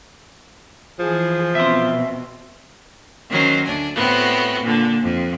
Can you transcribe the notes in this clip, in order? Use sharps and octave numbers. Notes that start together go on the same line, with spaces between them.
E3 F3 G#4
B2 C4 E5 C6
D#3 F#3 C#4 C5
D2 D4 G#5
A2 B3 C4 F#4
A#2 D3
F2